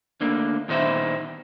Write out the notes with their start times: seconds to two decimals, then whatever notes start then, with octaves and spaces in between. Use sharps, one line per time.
0.21 D2 D3 A#3 D#4
0.69 A#2 D#3 B3 D#4 C5 E5